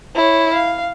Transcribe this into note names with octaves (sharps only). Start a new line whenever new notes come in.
E4 C#5
F5